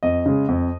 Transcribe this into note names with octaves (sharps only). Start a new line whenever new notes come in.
F2 D#5
C#3 G#3
F2